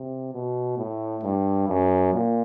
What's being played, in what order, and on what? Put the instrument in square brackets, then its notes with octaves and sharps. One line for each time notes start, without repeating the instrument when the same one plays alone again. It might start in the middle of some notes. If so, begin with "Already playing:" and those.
Already playing: [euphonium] C3
B2
A2
G2
F#2
A#2